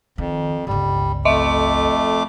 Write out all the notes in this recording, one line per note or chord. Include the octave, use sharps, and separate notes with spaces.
F2 D#3
G1 C#2 G3
F2 A3 D#5 E5 D6